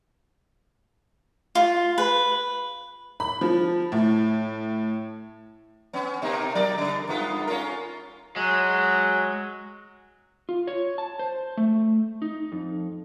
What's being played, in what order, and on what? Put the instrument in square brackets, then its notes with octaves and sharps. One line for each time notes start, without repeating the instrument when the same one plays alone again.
[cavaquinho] F4
B4
[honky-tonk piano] B5
F3
A2
[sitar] B3 C#4
B2 A#3 D#4
F#3 A#4 D5
C#3
G2 B3 F4
C#4 F4 A#4
[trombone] F#3 [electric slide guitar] G#3 [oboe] F#4
[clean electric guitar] F4
C#5
A5
C5
A3
D#4
F2